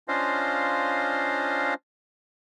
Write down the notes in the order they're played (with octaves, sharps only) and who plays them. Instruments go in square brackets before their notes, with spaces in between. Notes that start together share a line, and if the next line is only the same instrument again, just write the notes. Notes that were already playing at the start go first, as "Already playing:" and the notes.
[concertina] C#4 D4 F4 C5 D#5 F5